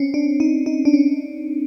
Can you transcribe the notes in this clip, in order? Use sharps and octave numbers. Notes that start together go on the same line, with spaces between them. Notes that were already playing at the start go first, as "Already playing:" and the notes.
Already playing: C4 C#4
D4
D#4
D#4
D4
C#4